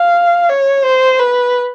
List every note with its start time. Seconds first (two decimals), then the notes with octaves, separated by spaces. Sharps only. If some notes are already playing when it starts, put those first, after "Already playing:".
Already playing: F5
0.49 C#5
0.84 C5
1.19 B4